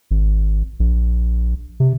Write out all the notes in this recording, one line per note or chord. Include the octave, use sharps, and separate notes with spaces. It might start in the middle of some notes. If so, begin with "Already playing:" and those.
G#1
A#1
C3